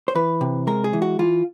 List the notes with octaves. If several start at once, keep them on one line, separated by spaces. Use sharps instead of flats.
C5
E3 B4
C3
G#3 A#4
G#4
E3
F#4
E3 F4